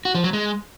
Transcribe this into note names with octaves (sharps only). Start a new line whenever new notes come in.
F#4
F3
F#3
G#3